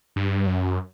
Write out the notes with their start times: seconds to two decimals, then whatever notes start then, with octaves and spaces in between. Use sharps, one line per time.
0.16 G2
0.47 F#2